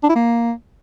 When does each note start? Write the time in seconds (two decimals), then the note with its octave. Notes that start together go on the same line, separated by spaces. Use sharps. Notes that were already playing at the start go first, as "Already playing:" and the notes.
0.03 D4
0.09 E4
0.15 A#3